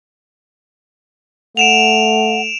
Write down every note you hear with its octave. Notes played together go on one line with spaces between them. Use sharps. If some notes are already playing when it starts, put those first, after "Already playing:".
A3 F#5 D7 E7 F7